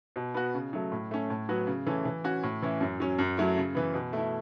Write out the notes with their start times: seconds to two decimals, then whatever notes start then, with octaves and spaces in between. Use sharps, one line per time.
0.16 B2
0.34 B3 F#4
0.54 C#3
0.73 F#3 A3
0.92 A2
1.11 A3 C#4
1.30 A2
1.49 F#3 B3 F#4
1.67 C#3
1.86 E3 A3 C#4
2.05 E3
2.24 C#4 F#4
2.43 A2
2.62 E3 C#4 E4
2.81 F#2
3.00 F#3 C#4
3.19 F#2
3.37 F#3 A3 E4
3.57 C#3
3.75 E3 B3
3.94 B2
4.13 A3 E4